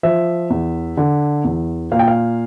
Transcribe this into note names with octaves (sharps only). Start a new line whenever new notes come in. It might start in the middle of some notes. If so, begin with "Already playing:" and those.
F3 E5
E2
D3
E2
A#2 F5
G5
F5